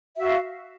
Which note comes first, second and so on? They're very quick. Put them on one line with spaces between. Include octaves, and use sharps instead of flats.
E5 F#4 F5